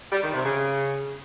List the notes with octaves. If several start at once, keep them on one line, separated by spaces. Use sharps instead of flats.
G3
D#3
C3
C#3